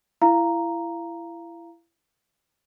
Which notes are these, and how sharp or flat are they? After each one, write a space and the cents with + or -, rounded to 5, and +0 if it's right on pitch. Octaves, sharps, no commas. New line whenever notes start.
E4 +25 F5 -15 A#5 +0